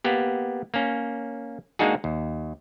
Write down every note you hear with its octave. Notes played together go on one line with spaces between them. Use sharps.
A#3 B3 G4
A#3 C#4
G#3 A#3 D4 D#4 F#4 G#4
D#2